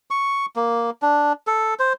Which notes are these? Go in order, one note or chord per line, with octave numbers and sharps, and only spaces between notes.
C#6
A#3
D4
A4
C5